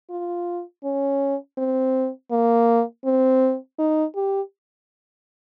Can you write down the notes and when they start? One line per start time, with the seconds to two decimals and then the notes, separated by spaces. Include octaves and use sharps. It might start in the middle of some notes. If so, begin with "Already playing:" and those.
0.10 F4
0.84 C#4
1.58 C4
2.31 A#3
3.05 C4
3.79 D#4
4.15 G4